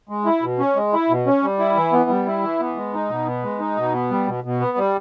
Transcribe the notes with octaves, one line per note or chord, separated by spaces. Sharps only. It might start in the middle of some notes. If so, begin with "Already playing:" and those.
G#3
E4
B2
C#4
G#3
E4
B2
C#4
G3
E4
E3
B3
G3
E4
E3
B3
G#3
D#4
B2
B3
G#3
D#4
B2
B3
G3
B2
B2
B3
G3